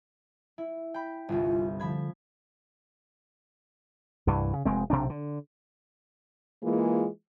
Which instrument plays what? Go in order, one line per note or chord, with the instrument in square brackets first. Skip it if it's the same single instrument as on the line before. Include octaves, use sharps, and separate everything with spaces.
[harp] E4
G5 B5
[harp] G1 C2 [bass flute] F4
[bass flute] D3 [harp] F3 B5 G#6
[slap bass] C2 G2 E3
C#3
F1 G#3 C4
B1 C3 C4 D4
D3
[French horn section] E3 G#3 A#3 F4 G#4